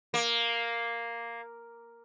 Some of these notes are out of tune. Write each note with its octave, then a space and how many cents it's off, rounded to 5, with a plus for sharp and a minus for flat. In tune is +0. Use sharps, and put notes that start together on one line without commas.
A#3 +0